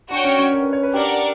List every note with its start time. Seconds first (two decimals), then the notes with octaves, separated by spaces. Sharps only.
0.10 D4 F#4 C#5 G5
0.24 C#4
0.39 C#4
0.52 A#4
0.62 B4
0.73 C#5
0.83 B4
0.94 D4 G4 A#4 D5 F#5